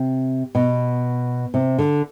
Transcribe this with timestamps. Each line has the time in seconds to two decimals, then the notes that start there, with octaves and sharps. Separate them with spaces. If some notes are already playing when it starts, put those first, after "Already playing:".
Already playing: C3
0.55 B2
1.54 C3
1.78 D3